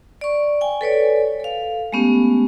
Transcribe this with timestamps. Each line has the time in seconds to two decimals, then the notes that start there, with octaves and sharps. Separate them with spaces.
0.21 D5 C#6
0.61 G5 G#5
0.81 A4 B4 C#5 D5
1.40 A4 F5
1.93 G#3 A3 B3 C#4 G4